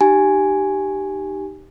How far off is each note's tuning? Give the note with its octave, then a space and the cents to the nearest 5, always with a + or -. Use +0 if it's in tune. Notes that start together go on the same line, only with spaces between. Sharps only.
D#4 -20 G4 -10 G#5 +0